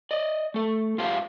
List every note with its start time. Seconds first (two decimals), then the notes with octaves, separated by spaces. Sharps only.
0.11 D5 D#5
0.54 A3 A4
0.98 G#2 F4 G4 C5 F5 A5